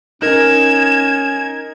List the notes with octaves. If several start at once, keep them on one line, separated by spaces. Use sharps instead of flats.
C#4 D#4 A#4 G#6 E7